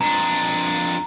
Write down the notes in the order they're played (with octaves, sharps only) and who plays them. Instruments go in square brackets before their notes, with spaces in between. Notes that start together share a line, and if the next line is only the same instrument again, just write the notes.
[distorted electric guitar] F2 D4 [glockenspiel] A#5